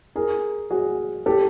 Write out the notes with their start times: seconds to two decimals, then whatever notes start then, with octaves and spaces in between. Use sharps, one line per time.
0.16 G#4 A#4
0.70 F#4 G#4
1.26 G4 A4